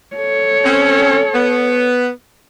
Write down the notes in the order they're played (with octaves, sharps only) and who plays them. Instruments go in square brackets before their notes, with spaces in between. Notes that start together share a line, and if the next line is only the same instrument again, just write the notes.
[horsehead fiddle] A4 C#5
[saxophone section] C4 C#4
B3